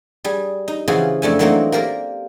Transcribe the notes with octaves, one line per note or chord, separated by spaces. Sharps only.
G3 G#4
D#4
C#3 E3 F3 F#4 G#4 C6
F2 A3 D4 G#5
E3 F#3 A3 A#3 C4 D#4
A#3 G4 A#4 D5